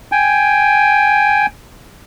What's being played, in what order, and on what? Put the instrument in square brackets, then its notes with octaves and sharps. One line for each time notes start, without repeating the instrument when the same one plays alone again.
[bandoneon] G5 G#5